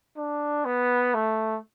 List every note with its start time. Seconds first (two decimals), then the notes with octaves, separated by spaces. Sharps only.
0.17 D4
0.65 B3
1.14 A3